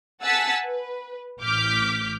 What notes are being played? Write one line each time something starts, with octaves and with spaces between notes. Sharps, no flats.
F#5 G#5 A5 E6 A6 B6
B4
A1 D6 F6 G6 B6